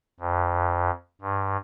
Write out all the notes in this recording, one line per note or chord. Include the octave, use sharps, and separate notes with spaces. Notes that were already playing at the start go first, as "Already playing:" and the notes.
F2
G2